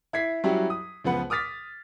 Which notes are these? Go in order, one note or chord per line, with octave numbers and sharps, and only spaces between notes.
E4 G#6 B6 C7
F#3 G3 C#4 E4 F#4 G4
D#6
C#2 F3 B3 F#5 B5
D6 D#6 F6 A6 B6